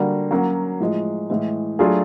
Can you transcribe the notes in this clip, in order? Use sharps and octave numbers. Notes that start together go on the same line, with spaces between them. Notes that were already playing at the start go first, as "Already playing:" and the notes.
Already playing: D3 G3 A#3 D4 F#4
F#3 A#3 C#4 F#4
A2 F3 G#3
A2 E3 G#3
F#3 A3 D4 F4 G#4